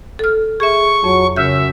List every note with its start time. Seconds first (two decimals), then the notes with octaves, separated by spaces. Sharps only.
0.19 A4 F6
0.60 G#4 E5 C#6
1.04 F2 F#3
1.36 F#2 C#3 E5 G6